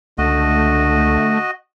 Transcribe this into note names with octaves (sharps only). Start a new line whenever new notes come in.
C#2 D3 A3 F#4 D#5